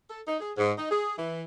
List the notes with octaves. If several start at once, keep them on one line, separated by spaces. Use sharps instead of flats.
A4
D#4
G#4
G#2
D#4
G#4
E3